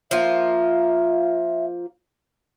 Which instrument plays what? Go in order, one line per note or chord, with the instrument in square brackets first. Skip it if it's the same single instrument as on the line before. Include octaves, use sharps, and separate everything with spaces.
[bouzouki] F3 A#3 F4 [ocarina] E5